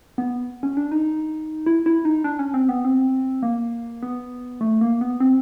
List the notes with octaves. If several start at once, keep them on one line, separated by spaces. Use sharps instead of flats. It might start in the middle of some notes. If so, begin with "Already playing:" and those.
B3
C#4
D4
D#4
E4
E4
D#4
D4
C#4
C4
B3
C4
A#3
B3
A3
A#3
B3
C4